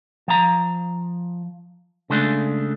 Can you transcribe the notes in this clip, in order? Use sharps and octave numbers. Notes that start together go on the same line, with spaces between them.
F3 A#5
C#3 G#3 A3 D4